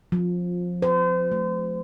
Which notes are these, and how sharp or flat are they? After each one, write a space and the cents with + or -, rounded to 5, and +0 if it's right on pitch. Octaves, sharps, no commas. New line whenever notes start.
F3 +20
C5 -35
A3 -35